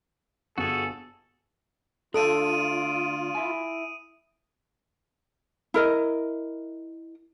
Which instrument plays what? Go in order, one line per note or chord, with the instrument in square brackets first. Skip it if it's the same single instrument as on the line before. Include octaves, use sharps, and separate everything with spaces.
[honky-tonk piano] G1 [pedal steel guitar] F#4 G#4 [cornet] A4
[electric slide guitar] D3 A3 D4 [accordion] F4 [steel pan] A4 [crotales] D#6 D7 D#7
[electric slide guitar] E4 E5 G#5
[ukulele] E4 A#4 D#5